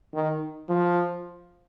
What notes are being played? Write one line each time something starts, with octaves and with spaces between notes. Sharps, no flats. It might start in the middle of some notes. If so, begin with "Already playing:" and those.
D#3
F3